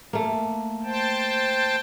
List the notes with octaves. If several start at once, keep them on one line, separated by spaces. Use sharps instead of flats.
A3 A#3
C5 G5 A5